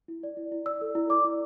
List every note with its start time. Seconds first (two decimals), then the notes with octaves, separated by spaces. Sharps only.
0.08 E4
0.23 D5
0.37 E4
0.52 E4
0.66 D5 E6
0.81 A4
0.95 E4
1.10 D5 D6
1.25 E4